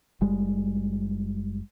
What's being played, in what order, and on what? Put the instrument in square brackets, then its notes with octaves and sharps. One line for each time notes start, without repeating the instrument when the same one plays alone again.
[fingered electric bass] F#1 G3 G#3